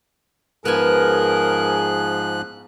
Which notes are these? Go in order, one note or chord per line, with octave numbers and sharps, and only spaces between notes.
G#2 F3 B3 G#4 A#4 G#5 F#6